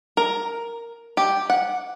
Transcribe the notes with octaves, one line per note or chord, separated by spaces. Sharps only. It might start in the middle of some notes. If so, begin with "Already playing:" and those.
A#4
G4
F#5